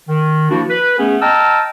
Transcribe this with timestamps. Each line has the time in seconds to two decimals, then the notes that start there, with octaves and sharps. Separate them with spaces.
0.09 D#3
0.50 F3 A#3 D4 E4 F#4
0.70 B4
0.99 A3 B3 C#4 G#4
1.22 D#5 G5 A5 A#5 E6 F6